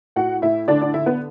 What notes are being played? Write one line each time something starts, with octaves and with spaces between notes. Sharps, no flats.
A2 F#4 F#5
A2 E4 E5
D3 D4 D5
D4 D5
D3 E4 E5
B3 B4